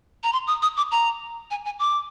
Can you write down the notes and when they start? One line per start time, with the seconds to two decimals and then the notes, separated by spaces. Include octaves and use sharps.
0.23 A#5
0.33 C6
0.47 D#6
0.62 D#6
0.77 D6
0.92 A#5
1.51 G#5
1.65 G#5
1.79 D6